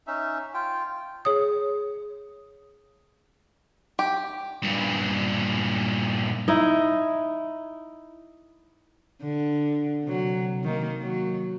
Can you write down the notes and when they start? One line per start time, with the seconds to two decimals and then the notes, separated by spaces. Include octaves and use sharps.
0.07 C#4 D#4 E5
0.54 F4 G5
1.25 G#4 C#5 D#6
3.99 G4
4.62 G2 A#2
6.48 D#4 E4
9.22 D3
10.03 C3 F#3
10.63 D#3 A#3
11.01 F#3